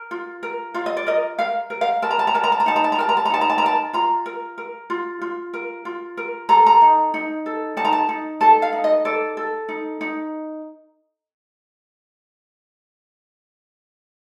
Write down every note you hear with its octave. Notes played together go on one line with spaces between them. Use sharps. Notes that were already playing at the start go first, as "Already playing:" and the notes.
Already playing: A#4
F4
A#4
F4 F5
D#5
D5
A#4 D#5
A#4 F5
A#4
F5
A#4 A5
A#5
A5
A#5
A#4 A5
A#5
A5
A#5
D#4 A5
A#5
A5
A#5
A#4 A5
A#5
A5
A#5
D#4 A5
A#5
A5
A#5
A#4 A5
F4 A#5
A#4
A#4
F4
F4
A#4
F4
A#4
A4 A#5
A#5
D#4
D#4
A4
D#4 A5
A#5
A5
D#4
A4 A5
F5
D#4
D#5
A4 D5
A4
D#4
D#4